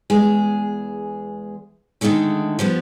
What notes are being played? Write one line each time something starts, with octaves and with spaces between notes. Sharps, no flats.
E2 G#3 G#4
D3 D#3 F#3 G#3 A3
F3 G3 B3